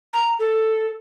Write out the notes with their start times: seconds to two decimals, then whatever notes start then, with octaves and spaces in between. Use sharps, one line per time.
0.13 A#5
0.39 A4